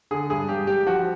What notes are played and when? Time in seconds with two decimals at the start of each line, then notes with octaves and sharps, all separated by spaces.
0.11 D3 G#4
0.30 G2 G#4
0.49 G2 G4
0.67 G3 G4
0.86 F3 F#4